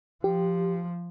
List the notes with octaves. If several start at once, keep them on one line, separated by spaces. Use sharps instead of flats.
F3 G4